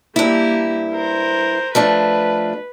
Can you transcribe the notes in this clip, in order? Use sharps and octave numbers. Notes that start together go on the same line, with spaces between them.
G2 A#3 E4 G4
A#4 C5
F3 A3 D4 B4